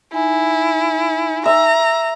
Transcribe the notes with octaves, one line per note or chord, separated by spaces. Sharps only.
D#4 E4 G#5
E5 A#5